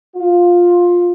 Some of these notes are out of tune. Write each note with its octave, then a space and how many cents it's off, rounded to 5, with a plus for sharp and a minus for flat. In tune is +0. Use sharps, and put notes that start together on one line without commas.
F4 +10